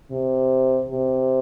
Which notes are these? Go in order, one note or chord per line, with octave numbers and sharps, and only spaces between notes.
C3
C3